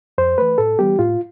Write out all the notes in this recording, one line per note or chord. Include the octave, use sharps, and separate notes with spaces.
F2 C5
E3 A3 B4
A2 A4
E3 G3 B3 G4
A2 F4